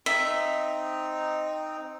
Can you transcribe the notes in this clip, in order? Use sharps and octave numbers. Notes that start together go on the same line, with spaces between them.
C4 D#4 E5